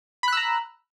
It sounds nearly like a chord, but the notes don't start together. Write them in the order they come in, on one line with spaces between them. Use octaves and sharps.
B5 F#6 E6 A#5